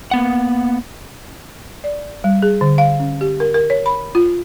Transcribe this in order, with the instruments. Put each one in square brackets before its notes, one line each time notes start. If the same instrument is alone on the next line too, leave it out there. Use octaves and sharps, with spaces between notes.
[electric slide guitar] A#3 B3 F#5
[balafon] D5
G3
G#4
D3
F5
C#4
G4
A#4
A#4
C#5
B5
F4